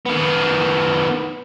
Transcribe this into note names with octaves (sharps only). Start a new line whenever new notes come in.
D#3 B3